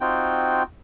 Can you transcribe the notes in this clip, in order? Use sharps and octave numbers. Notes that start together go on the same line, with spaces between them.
C4 D#4 F4 F#4 G5